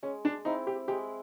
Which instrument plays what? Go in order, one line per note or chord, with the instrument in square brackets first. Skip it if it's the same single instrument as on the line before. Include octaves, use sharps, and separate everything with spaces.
[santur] G#3 [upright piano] C#4
[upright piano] D4
[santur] C4 E4 [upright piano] D#4
[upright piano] G4
[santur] G#3 [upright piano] G4